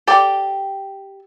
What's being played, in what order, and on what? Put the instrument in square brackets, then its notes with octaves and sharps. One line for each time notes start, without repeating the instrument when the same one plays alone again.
[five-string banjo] G4 A4 D5 G5